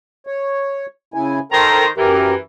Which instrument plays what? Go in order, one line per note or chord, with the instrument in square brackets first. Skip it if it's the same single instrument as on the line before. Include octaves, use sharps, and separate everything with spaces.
[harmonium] C#5
C#3 E4 G#5
[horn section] D#3 C5 A#5 [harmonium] A4 A#4 G5
[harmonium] F#2 G4 A#4 [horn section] E3